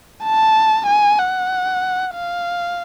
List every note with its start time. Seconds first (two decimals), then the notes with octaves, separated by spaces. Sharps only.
0.23 A5
0.87 G#5
1.19 F#5
2.15 F5